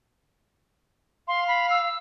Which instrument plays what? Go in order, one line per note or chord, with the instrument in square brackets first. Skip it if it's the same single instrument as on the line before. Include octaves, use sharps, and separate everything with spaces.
[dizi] F5 [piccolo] C6
[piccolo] B5
E6